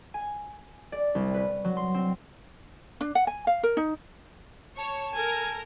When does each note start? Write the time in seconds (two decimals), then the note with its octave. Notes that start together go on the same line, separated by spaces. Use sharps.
0.14 G#5
0.92 D5
1.15 C2
1.34 B4
1.65 F#3
1.77 C6
1.94 C4
3.01 D4
3.15 F#5
3.27 G#5
3.47 F5
3.63 A#4
3.77 D#4
4.77 C#5 A5
5.15 A4 A#4 G#5